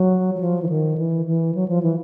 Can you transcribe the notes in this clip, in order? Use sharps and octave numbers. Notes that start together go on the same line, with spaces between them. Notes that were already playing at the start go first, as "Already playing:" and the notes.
Already playing: F#3
F#3
F3
E3
D#3
E3
E3
F#3
F3
E3